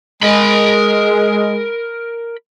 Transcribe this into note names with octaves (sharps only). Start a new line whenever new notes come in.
G#3 A#4 B5